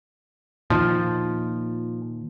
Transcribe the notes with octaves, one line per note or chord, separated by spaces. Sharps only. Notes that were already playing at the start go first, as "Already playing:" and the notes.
A#2 D#3 F3